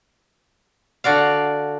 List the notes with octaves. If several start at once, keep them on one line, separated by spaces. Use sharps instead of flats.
D3 F#4 D5 F5